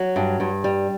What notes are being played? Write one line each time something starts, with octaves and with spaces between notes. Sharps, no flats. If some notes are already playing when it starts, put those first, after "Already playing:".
Already playing: F#3
G2
G2
G3